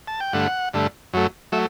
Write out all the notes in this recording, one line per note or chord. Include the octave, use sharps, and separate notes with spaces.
A5
G5
G2 D3 A3 F#5
G2 D3 A3
F#2 F#3 A3
F#3 A3 E5